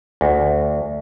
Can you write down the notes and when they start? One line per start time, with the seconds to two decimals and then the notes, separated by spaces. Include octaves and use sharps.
0.21 D2